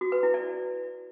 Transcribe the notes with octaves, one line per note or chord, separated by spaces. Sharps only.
F#4
B4
E4
D5